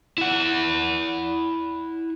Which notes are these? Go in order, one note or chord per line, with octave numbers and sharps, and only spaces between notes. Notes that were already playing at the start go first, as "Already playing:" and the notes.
E4 F#5